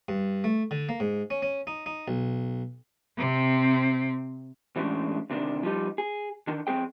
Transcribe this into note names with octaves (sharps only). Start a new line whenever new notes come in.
G2
A3
D3
A#3
G#2
C#4
C#4
D#4
D#4
B1
C3 C4
A2 E3 G#3 A3 C#4 D4
D2 C3 D#3 D4
F3 G3 D#4
G#4
D3 D#3
F2 F#3 C4 G#4 G5